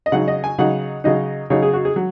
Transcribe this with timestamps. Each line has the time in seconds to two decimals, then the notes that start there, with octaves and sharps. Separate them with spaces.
0.06 D#5
0.12 C#3 F#3 D#4 F#5
0.28 D#5
0.44 G#5
0.58 C#3 F#3 D#4 F#5
1.04 C#3 F#3 D#4 D#5
1.50 C#3 F#3 D#4 C#5
1.62 G#4
1.73 F#4
1.85 G#4
1.96 F#3